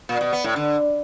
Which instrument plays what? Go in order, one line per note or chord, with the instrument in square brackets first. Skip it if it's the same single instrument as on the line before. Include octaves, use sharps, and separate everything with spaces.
[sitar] A#2
B2
B3
A2
D3